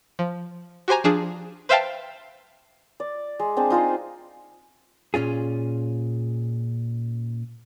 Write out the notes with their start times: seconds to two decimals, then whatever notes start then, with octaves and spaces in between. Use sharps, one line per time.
0.19 F3
0.88 F#4 G4 C5 G#5 A#5
1.04 F3 D4 G#4
1.69 B4 C5 E5 F5 G5 A5
3.00 D5
3.39 G#3
3.57 C4 D4 G#4
3.70 D#4 F4 G#4 C5
5.14 A#2 C#4 F4 G#4